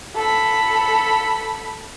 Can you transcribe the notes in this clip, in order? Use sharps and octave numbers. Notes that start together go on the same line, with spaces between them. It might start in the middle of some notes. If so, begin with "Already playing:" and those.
A4 B5